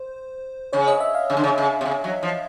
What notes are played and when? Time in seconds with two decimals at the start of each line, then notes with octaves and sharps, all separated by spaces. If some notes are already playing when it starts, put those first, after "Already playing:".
Already playing: C5
0.73 C#3 C#5
0.87 D#5
1.00 E5
1.15 F5
1.30 C#3
1.37 D3
1.44 C#3
1.58 C#3
1.81 C3
1.86 C#3
2.04 F#3
2.23 F3